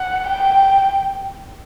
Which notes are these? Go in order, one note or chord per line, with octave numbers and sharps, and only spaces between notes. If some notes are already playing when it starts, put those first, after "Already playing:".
Already playing: F#5
G5